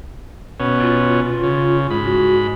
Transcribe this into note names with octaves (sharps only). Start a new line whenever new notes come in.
B2 C#4
F4
C#3
G#2 B5
F#4